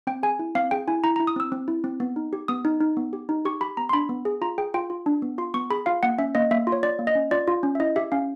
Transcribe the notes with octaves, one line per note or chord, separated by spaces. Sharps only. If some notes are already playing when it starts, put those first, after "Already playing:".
C4 G5
G#4 G#5
E4
C4 F5
G#4 G5
E4 G#5
E4 A#5
A#5
E4
D#6
C4 E6
C4
E4
C4
B3
D#4
G4
B3 D#6
D#4
D#4
B3
G4
D#4
G4 C#6
G4 B5
B3 A#5
C6
D4 B5
B3
G#4
F4 A#5
G#4 G5
F4 G5
F4
D4
B3
F4 C6
B3 C#6
G#4 B5
F4 F5
A#3 F#5
C#4 E5
A#3 D#5
A#3 E5
F4
C#5
F4 D5
A#3
D#5
C#4
F4 D5
F4
C#4
E5
E4 D#5
G4 E5
C#4 F5